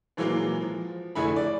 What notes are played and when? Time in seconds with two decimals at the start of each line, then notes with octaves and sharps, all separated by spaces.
0.17 A#2 E3 F#3 G#3 A#3
0.61 F3
1.15 F1 D3 A3 E4 G#4 B5
1.36 D5